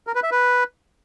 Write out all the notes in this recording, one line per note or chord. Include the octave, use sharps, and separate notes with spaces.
A#4
B4
E5
B4